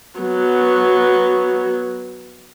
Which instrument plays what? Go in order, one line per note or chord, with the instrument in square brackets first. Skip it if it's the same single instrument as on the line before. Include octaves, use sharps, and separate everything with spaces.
[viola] F#3 B3